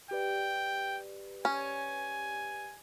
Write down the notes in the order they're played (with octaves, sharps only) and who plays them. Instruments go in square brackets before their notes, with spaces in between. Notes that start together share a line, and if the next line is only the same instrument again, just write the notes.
[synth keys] G4 B4 D5 [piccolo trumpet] G5
[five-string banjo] C#4 [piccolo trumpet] G#5